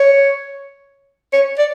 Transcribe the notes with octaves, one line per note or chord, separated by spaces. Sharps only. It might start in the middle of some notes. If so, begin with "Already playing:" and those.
Already playing: C#5
C#5
D5